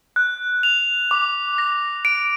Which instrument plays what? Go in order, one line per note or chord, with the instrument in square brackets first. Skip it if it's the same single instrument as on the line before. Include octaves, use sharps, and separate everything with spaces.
[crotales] F#6
F7
D6
A#6
D7